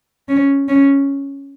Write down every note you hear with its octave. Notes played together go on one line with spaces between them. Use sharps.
C#4
C#4